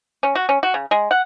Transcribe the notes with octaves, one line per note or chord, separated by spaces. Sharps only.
C#4
F#4
C#4
F#4
C#3
G#3
F#5